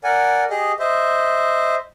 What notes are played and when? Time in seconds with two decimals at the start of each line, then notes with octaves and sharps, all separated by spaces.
0.04 A#4 D5 F#5 G#5
0.50 G4 G#4 D#5
0.79 C5 D#5 E5